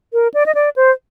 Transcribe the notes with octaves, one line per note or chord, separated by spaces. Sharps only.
A#4
D5
D#5
D5
C5